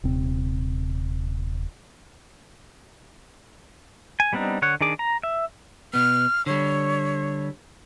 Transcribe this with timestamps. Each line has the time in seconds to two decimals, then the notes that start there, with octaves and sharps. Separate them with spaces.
0.04 D#1 C3 C4
4.20 G#5
4.33 G3 B3 C4 D4 D#4
4.62 D3 C#5 F#5
4.81 D#3 D4 G#4 D6
4.99 A#5
5.23 E5
5.94 B2 B3 F6
6.46 D3 G3 C#5